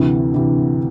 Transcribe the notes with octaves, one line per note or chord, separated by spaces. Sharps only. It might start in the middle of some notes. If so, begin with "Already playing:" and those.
Already playing: D2 C3 E3
C3 E3